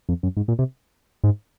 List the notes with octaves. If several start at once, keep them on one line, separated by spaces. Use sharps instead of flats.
F2
F#2
G#2
A#2
C3
G#2